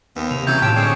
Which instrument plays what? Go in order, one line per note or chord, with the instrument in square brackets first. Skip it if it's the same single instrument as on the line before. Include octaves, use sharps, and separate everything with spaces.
[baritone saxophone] D#2 [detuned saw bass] B3
[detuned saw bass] C3 [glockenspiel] F7
[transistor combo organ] C#3 E3 [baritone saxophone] F#3 [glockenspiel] G6 G#6
[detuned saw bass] A2 [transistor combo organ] F4 [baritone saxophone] G4 [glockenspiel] A5 D7 E7
[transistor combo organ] D3 G#3 C#5 [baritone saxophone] C4